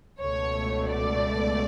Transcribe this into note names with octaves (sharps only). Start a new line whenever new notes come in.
C#2 B2 A3 C#5
D5